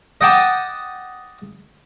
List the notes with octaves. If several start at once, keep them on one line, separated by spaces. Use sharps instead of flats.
D#5 F#5 G5 A5 D6 D#6